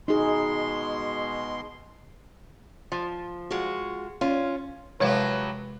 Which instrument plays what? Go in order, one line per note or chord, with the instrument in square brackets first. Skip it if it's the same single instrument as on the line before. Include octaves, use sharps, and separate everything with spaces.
[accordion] B2 G#3 C6 [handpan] D#4 G#4
[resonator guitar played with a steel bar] F3
[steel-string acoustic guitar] G#3 F4 F#4
[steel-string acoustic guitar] C#4 [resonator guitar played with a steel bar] F4
[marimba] C3 G#3 E5 [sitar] F3 F#3 G4 [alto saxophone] B4 [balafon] C#5